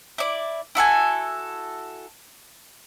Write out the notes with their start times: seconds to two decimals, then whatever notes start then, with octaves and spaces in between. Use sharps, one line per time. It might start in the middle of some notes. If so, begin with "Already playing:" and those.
0.18 E4 D5
0.75 E4 F#4 A4 G#5